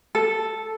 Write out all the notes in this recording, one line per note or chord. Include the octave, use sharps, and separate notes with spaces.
A4